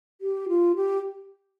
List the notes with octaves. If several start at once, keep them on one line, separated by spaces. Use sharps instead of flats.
G4
F4
G4